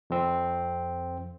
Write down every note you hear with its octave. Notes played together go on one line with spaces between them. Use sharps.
F2 C4